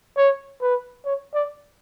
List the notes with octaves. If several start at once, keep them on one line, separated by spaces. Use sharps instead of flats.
C#5
B4
C#5
D5